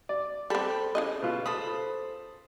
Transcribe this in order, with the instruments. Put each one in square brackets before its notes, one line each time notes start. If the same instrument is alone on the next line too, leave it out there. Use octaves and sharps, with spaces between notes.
[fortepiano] D5
[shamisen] G3 C4 [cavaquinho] A4 B5
[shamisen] C#3 E4 D#5
[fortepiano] B2 F4
[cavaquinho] A4 C5 B5 [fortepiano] D#6